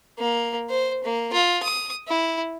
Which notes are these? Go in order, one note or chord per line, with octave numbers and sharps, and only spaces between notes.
A#3
C5
A#3
F4
D#6
E4